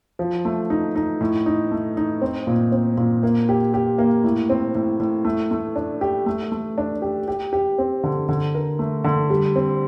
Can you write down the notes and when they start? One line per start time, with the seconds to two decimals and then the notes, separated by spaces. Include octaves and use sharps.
0.19 F3
0.45 A3
0.70 D#4
0.96 D#4
1.21 A2
1.46 D#4
1.71 A3
1.97 D#4
2.21 C4
2.47 A#2
2.72 C4
2.97 A#2
3.23 A#3
3.49 G4
3.74 G4
3.98 A#3
4.24 A2
4.50 C4
4.75 A2
5.00 A2
5.25 A3
5.51 A3
5.76 D4
6.01 G4
6.26 A3
6.52 A3
6.78 D4
7.02 G4
7.28 G4
7.53 G4
7.78 C4
8.04 D3
8.29 D3
8.55 A#4
8.79 A3
9.04 D3
9.30 G3
9.56 C4